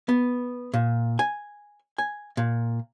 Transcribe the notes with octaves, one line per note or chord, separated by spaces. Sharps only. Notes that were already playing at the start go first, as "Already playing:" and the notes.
B3
A#2
G#5
G#5
A#2